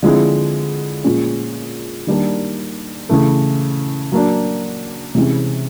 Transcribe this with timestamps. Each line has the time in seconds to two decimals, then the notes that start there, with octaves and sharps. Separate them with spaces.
0.03 D3 F3 G#3 C4 E4
1.04 A#2 F3 G#3 C#4
2.07 D#3 G3 A#3 D4
3.09 C#3 E3 A3
4.12 F#3 A#3 D4
5.15 C3 E3 G#3 C#4